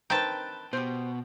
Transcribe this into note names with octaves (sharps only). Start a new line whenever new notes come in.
D#3 C4 B4 G5 A5
B2 G4 C5